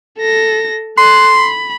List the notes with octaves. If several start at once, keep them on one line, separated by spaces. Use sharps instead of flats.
A4 A#6
A4 C6 F#6
B5